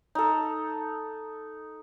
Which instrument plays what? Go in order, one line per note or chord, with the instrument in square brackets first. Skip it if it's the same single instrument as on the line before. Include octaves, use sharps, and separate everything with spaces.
[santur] D#4 A4